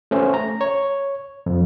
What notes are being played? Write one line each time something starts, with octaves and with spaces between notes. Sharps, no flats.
A3 C#4 C5
A#5
C#5
F2